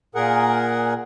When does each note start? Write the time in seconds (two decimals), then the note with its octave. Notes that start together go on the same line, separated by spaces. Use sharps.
0.15 A#2 G#4 A#4 F#5